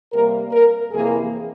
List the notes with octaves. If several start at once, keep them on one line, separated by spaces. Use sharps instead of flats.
C3 G3 A#3 A#4
A#4
F2 C3 E3 A#3 G#4